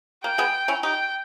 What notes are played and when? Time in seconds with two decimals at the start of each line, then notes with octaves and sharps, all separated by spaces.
0.23 A#3 G5
0.38 G#3 B3
0.68 C#4 E4
0.83 D#4 G4 G5